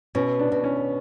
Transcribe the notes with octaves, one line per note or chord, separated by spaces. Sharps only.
B2 C#4
D4
B2
C#4